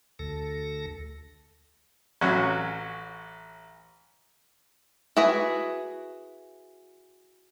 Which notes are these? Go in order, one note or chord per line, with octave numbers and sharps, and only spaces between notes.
D2 A4 A#6
A1 F#3 C#4 F#4
E4 F#4 G#4 B4